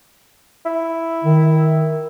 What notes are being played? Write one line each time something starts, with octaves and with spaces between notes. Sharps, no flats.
E4
D#3